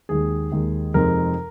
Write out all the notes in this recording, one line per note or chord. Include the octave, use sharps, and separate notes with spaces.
D#2 D#3 G#3 G#4
D#2 D#3 G#3
F2 C3 G#3 C4 D#4 A#4